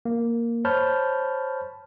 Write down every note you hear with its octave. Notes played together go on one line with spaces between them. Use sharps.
A#3
C5 C#5 A5 B5 F6 G6